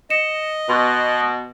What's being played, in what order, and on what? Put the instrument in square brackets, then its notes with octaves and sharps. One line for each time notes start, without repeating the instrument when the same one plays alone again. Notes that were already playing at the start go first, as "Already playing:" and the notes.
[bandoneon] D#5 [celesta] C#7 E7
[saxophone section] B2 [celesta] C6 C#6 F#6